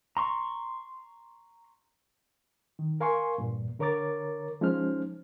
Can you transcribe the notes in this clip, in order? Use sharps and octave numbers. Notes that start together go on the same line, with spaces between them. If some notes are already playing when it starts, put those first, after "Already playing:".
A#5 C6 C#6
D#3
A#4 F5 G#5 C6 C#6
E2 G2 A#2
D3 A#4 C#5 A#5 D6 A6
F3 G#3 C#4 D#4 C5 F6